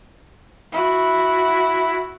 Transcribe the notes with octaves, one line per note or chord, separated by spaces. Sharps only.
E4 F#4